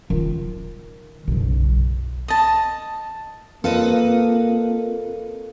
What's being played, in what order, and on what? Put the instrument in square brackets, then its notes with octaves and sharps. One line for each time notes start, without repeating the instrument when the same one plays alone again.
[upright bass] D#3 F4
F#1 B1
[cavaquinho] D#5 A5
[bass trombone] A#3 [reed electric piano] C4 F4 F5 [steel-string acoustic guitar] A4 B4 D#5